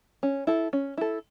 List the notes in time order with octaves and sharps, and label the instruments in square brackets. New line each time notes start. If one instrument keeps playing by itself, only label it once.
[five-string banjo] C#4
E4 A4
C#4
E4 A4